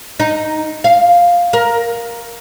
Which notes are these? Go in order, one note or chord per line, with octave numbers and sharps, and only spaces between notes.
D#4
F5
A#4